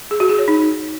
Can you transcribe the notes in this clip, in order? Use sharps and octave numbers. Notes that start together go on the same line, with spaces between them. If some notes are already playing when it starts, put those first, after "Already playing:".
G#4
F#4
G#4
C#5
D#4